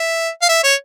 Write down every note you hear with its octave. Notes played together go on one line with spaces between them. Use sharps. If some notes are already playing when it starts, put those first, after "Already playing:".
Already playing: E5
F5
E5
C#5